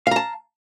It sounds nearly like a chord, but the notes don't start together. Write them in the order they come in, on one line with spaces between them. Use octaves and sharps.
F5 A#5 A5